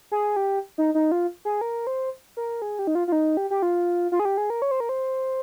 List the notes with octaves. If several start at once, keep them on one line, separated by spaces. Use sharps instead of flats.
G#4
G4
D#4
D#4
F4
G#4
A#4
C5
A#4
G#4
G4
D#4
F4
F4
D#4
G4
G4
F4
F4
G#4
G4
G#4
A#4
C#5
C5
A#4
C5